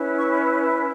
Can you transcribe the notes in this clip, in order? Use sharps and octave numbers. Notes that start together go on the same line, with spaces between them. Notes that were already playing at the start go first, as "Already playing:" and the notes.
Already playing: C#4 E4 B4
C#6
B5